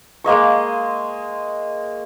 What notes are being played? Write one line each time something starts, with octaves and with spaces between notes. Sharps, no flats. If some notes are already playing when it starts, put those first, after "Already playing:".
G#3 A#3 D#5 C#6